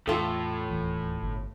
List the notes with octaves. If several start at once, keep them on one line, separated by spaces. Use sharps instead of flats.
E2 A2 F4 A4
D1 D#2 E3
G1 D3